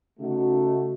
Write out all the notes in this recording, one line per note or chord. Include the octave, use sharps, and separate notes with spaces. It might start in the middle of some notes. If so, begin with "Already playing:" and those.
C#3 A3 D#4 F#4